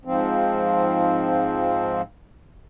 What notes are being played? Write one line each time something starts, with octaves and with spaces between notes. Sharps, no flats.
G#2 F3 C4